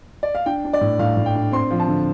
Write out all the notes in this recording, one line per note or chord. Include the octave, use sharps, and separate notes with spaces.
D5
F5
D4 G5
D4
D5
A2
A2 F5
A2
G5
D4
C4 C6
F3
A5
D3